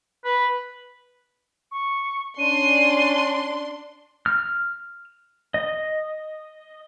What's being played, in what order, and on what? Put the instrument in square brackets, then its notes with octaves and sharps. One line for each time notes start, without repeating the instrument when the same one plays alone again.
[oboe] B4
[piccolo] C#6
[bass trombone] C#4 [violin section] D4 C6 [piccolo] D#7
[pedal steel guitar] F6
D#5